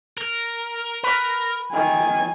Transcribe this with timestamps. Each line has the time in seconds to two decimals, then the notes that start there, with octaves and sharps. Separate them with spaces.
0.18 A#4
1.03 B4
1.73 D#3 G#5